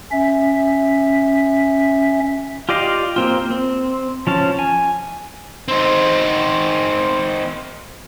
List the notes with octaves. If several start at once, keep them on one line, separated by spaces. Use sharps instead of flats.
C#4 E5
F4 G4 D5 D#5 F5
A#3 C4 F4
C4
F3 C#4 A5
G#5
C4 D#4